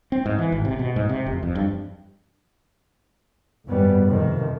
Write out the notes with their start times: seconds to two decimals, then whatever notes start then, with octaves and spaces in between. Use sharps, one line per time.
0.12 C4
0.26 G#2
0.38 E3
0.52 G#1
0.65 C3
0.79 B2
0.96 G#2
1.09 C3
1.26 F1
1.43 F2
1.55 G2
3.66 G#1 F#2 G3 B3
4.09 F2 C3 D#3 F3